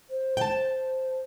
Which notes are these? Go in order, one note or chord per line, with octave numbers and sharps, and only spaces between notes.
C5
C5 G5 A5